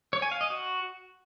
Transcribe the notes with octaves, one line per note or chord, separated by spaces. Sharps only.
C#5
G#5
F5
D#5
F#4